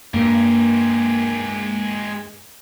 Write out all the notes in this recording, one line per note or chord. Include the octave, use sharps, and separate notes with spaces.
G2 G#3 A#3 G4